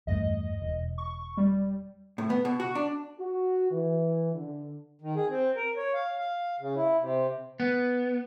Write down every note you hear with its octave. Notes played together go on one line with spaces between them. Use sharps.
E2 G2 A3 D#5
E1
C#6
G3
A2
B3
B2
F#4
D4
F#4
E3
D3
D#3
G#4
C4
A#4
C#5
F5
F5
C#3
E4
C3
B3